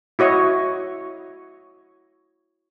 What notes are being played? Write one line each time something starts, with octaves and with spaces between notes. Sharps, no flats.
E4 F#4 C#5 D#5 C#6